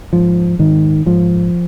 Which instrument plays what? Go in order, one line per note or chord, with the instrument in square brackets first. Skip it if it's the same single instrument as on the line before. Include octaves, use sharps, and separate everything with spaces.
[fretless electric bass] G#2 F3
G#2 D#3
G#2 F3